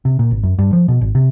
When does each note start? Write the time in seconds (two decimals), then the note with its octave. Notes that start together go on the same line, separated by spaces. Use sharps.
0.05 C3
0.19 A#2
0.31 G#1
0.43 F#2
0.59 G2
0.73 F3
0.88 B2
1.01 G#1
1.15 C3